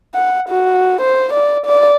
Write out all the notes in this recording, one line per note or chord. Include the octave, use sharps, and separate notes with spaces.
F#5
F#4
C5
D5
D5